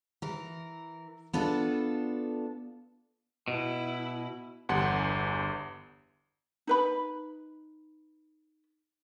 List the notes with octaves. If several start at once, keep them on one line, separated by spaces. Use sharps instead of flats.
E3 A#4
B3 D4 F4 A4
B2 E4
G1 E2 G4 F#5 C6
D#4 B4 B5